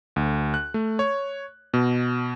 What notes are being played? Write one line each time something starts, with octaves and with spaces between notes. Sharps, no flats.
D2
F#6
A3
C#5
B2